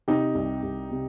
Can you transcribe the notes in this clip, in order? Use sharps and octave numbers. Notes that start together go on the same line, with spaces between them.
C3 D#4 G4
C2
C2
C3